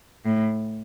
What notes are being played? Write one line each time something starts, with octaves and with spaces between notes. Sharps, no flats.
A2